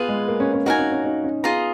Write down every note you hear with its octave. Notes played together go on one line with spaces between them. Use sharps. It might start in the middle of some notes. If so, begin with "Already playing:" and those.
Already playing: B3 F4 G#4 B4
G#3
A#3
C#4
C#4
D#4 F#4 A#4 F5 G#5
C#4
C#4
D#4
C#4
B3 F4 G#4 D#5 A#5